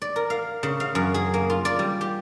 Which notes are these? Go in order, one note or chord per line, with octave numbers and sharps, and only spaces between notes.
D5
A#4
F5
C#3
F5
F#2
G#4
A#3
F4
D5
G3
G4